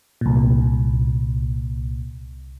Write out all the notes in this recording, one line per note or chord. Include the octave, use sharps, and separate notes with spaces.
C2 A#2